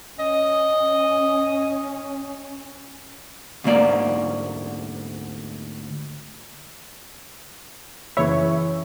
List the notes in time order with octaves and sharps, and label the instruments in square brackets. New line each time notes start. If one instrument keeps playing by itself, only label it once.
[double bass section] C#4 [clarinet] D#5
[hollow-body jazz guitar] D2 G#2 A#3 D5
[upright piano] F#2 C#3 E3 [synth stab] E4 C#5